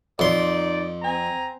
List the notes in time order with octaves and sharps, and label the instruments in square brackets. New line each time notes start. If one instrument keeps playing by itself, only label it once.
[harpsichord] F2 C6 [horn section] D#4 D5
[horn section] C4 G#5 A#5